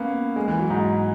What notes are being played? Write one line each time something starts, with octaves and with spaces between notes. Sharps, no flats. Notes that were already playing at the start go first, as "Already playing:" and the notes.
Already playing: A#3 B3 C#4
G#3
E3
F#3
G#2